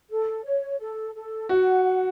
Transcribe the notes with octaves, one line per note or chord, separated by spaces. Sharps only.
A4
C#5
A4
A4
F#4 F#5
F#5